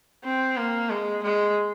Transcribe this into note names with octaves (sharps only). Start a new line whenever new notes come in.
C4
A#3
G#3
G#3